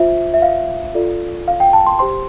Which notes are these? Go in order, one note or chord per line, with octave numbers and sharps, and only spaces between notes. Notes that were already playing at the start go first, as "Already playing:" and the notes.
Already playing: F4 C5 E5
E5
F5
F4 A4 D5
F5
G5
A5
C6
G4 C5 C6